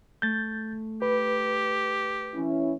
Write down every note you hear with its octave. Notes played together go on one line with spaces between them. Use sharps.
A3 G6 A6
G4 B4
E3 C#4 E4